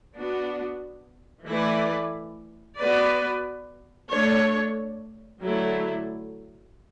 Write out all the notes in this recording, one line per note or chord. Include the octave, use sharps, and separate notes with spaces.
B3 D4 F#4
E3 A3 E4 B4 D5
B3 F#4 B4 D5
A3 D4 A4 C#5
D3 F#3 A3 E4 A4